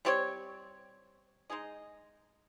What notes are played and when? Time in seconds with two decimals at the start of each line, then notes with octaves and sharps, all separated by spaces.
0.05 G3 C4 G4 C#5
1.50 G#3 D#4 G#4 D#5